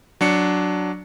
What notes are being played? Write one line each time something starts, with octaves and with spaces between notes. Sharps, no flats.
F#3 D4 C#7